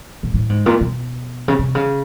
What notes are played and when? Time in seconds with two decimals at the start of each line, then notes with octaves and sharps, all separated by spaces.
0.23 A#2
0.34 A2
0.49 G#2
0.66 A#2
0.81 B2
1.48 C#3
1.59 C3
1.75 C#3